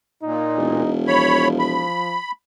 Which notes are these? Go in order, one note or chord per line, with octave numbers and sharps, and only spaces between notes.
A#2 D#4
E1
F3 C#5 B5
B5